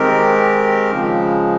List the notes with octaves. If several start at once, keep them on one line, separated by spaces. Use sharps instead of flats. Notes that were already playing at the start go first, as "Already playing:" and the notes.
Already playing: D#3 G#3 C4 G4 A#4
C#3 F3 G#3